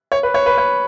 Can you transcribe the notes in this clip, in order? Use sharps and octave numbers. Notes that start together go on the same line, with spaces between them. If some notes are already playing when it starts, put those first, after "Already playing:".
C#5
B4
C#5
B4
C#5